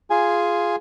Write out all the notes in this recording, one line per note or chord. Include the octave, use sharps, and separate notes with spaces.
F4 G#4 G#5